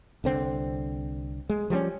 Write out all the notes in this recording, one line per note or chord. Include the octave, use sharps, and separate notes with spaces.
C2 D3 C4
G#3
F3 G3 A3 C#4